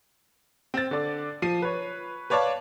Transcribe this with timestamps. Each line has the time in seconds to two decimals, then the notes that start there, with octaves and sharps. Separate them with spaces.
0.74 C4 A6
0.91 D3 D5
1.42 F3 C7 D#7
1.62 B4 C#5
2.30 B4 C#5 D5 F5 A5